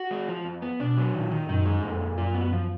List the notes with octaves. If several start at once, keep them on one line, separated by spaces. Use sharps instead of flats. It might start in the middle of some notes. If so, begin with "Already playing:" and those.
Already playing: F#4
G#3
F3
F2
B3
B2 D4
F#3
A#2 D#3
D#3
F#2 D#4
G#3
F2 A#2
A#2
F#2 F4
B3
F3